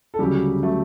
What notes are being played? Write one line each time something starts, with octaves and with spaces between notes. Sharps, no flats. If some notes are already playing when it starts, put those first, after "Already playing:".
A4
D2 C#3 F#3 G3 G4
C#3 F#3 A3 A4